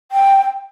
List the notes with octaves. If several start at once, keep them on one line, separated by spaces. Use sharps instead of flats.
G5